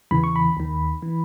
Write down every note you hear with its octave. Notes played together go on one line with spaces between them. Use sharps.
E2 C#3 E3 B5
C#6
B5
D#2 D#3
E3